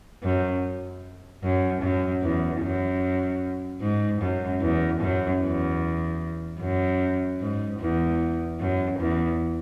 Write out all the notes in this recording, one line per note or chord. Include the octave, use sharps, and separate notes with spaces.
F#2
F#2
F#2
E2
F#2
G#2
F#2
E2
F#2
E2
F#2
G#2
E2
F#2
E2